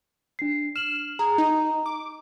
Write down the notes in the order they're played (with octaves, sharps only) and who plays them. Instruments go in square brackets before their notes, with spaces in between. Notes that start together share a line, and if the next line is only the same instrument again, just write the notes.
[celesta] D4 C7
[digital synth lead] F6 [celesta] E7 F#7
[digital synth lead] G#4 [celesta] A#5
[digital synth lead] D#4
D6